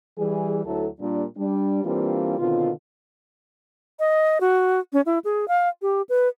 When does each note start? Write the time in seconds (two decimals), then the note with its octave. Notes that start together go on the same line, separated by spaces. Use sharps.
0.18 E3 G3 G#4
0.65 D2 F#3 E4 A4
1.00 A#2 G3 D4
1.38 G3 D4
1.84 E3 G3 A#3 C4 D4 F4
2.38 B2 D3 D#3 C4 F4
3.99 D#5
4.41 F#4
4.93 C#4
5.06 E4
5.24 G#4
5.48 F5
5.82 G4
6.09 B4